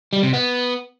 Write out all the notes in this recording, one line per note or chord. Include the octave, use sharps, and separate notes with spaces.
G3
C3
B3